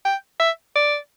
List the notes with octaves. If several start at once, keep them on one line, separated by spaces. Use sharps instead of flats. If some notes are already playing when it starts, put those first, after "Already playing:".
G5
E5
D5